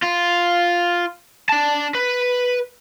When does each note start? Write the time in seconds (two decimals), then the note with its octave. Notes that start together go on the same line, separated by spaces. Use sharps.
0.03 F4
1.49 D4 A5
1.95 B4